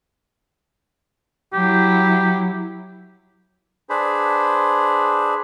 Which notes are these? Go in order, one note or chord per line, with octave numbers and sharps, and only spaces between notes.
F#3 E4 G4
D4 G#4 B4 C5